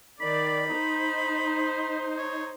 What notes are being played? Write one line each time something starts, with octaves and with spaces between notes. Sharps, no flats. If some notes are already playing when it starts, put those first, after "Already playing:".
D#3 D5 B5
D#4 C5
C#5